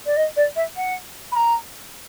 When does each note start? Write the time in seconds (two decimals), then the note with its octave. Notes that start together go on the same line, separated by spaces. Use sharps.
0.06 D5
0.16 D#5
0.36 D5
0.56 E5
0.76 F#5
1.32 B5
1.36 A#5